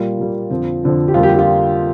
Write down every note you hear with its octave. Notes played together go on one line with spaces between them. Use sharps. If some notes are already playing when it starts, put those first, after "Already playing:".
Already playing: A#2 G3 A#3 F4
A#2 G3 A#3
F2 D3 F3 C4
F2 D3 F3 C4
G4
F2 D3 G3 A#3 F4
G4
G4
F4